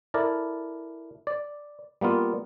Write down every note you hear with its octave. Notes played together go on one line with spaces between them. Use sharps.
E4 A4 A#4 D5
D5
G3 A#3 B3 F4